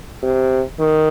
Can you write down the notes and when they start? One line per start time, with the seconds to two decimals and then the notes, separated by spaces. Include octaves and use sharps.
0.23 C3
0.80 D#3